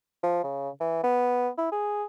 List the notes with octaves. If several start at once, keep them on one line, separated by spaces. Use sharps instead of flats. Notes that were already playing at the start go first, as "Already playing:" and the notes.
F3
C#3
E3
B3
E4
G#4